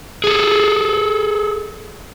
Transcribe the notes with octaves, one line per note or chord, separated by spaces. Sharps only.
G#4 A4